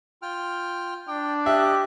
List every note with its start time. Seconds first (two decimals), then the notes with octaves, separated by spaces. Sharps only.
0.22 F4 G5 F6
1.08 D4 G5 D6
1.46 G4 D#5 E5 F#6